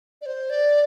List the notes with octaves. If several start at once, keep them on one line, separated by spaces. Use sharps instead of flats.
D5
C5
D5